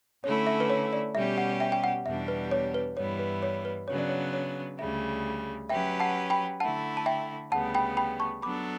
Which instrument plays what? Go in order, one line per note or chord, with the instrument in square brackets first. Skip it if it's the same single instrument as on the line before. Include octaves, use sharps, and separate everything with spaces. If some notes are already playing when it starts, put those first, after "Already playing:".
[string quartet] D3 A3 C#4 E4 [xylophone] C#5
[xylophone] E5
B4
C#5
D5
[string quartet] B2 G3 C#4 G4 [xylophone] E5
[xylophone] F#5
E5 G5
G5
F#5
[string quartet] E2 B2 G3 D4 G4 [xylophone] E5
[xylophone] B4
C#5
B4
[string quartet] G2 E3 G3 B3 E4 [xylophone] C#5
[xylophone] B4
C#5
B4
[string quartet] C#3 F#3 B3 D4 [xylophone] C#5
[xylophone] D5
C#5
C#5
[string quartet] D2 C#3 G3 [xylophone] E5
[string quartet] F#3 C#4 G4 B4 [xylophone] E5 G5
[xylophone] F#5 A5
G5 B5
[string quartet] D3 A3 E4 [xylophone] F#5 A5
[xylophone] A5
E5 G5
[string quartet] D2 C#3 G3 B3 [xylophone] F#5 A5
[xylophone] G5 B5
G5 B5
A5 C#6
[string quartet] F#3 B3 D4 A4 [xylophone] B5 D6